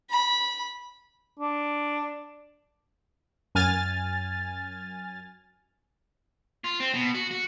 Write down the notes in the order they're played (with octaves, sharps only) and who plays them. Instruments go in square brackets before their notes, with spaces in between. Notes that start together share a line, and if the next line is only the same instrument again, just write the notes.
[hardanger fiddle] B5
[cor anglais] D4
[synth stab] F#2 G#5 F6 A6
[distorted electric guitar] F4
C4
B2
F#4
F#4